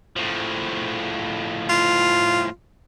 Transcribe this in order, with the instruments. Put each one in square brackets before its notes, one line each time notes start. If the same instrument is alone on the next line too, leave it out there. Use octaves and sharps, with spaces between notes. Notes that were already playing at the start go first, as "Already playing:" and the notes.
[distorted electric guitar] A2 F3
[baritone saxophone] F4